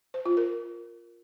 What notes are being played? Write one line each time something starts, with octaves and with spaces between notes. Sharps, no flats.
C5
F4
A#4